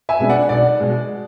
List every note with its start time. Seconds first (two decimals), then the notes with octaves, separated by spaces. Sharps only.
0.09 E5 G#5
0.19 B2 G#3 B3 D4
0.29 D5 F#5
0.49 B1 D5
0.80 B2 G#3